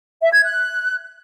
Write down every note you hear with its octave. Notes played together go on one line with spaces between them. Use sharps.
E5
G#6
F#6